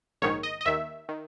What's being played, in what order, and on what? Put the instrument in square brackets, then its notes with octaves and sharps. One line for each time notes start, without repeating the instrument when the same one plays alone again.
[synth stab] A#1 G#2 D#3 C#5
D#5
D#5
D#2 D#3 E5
D#3